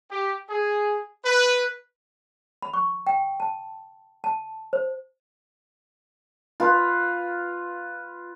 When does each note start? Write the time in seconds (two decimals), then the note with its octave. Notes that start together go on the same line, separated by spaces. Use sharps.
0.11 G4
0.49 G#4
1.24 B4
2.62 B5
2.74 C#6
3.07 G5
3.40 A5
4.24 A5
4.73 C5
6.60 F4 B4